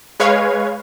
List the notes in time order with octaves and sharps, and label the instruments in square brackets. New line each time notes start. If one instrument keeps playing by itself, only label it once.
[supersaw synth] G#3 B4 C#5 F5 G#6